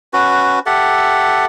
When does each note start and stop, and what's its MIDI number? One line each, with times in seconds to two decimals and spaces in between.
0.13 0.59 61
0.13 0.59 66
0.13 0.59 71
0.66 1.46 67
0.66 1.46 69
0.66 1.46 76
0.66 1.46 78